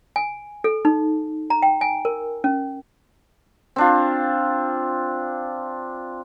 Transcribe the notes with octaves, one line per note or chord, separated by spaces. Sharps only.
G#5
A4
D#4
A#5
G5
G#5
A#4
C#4
C4 D4 F4